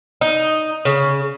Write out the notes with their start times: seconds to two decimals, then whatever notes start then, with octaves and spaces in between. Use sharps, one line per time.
0.21 D#4
0.85 C#3